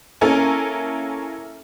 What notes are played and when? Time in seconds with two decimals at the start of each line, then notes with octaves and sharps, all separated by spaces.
0.21 A#3 C#4 E4 A4 A#4 G#5